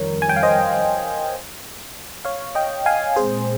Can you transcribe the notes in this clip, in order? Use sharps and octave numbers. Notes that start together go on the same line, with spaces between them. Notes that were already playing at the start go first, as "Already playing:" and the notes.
Already playing: F2 D#3 G3 A#4 C#5
G#5
G5
F5
C5 D#5
C#5 F5
D#5 G5
F5 G#5
A#2 G#3 C4 G#4 C5